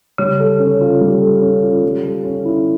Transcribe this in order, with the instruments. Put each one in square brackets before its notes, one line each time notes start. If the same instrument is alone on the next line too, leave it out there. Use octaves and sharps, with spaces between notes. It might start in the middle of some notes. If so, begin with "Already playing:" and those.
[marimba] C#3 [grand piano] G3
[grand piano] A4
C#4
F4
G3
A4
C#4
F4
G3
A4
C#4
E4